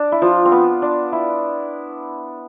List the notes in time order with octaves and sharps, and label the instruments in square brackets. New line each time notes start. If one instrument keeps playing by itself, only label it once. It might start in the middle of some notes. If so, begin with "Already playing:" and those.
Already playing: [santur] D4
E4
F3 F4
C4
B3
D4
E4